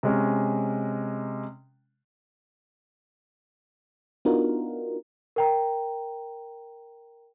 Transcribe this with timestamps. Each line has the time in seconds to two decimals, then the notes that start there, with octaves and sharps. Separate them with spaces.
0.03 C3 G#3 C#4
4.25 B3 D4 D#4 F4 F#4 A#4
5.36 A#4 G5 A#5